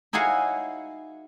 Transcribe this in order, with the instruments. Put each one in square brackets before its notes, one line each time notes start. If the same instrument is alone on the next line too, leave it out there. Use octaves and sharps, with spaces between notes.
[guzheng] D#4 E4 F#4 G#4 C#5 F5